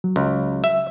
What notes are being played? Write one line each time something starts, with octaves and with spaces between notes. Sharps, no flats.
F#3
C#2
E5